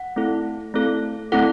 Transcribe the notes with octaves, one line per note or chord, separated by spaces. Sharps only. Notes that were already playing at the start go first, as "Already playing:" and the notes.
Already playing: F#5
A3 C4 E4 A4
A3 C4 E4 A4
A3 C4 E4 A4 F#5